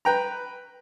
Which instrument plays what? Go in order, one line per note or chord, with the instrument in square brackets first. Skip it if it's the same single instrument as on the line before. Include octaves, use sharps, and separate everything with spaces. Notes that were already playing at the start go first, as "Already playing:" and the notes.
[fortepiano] B4 G5 A#5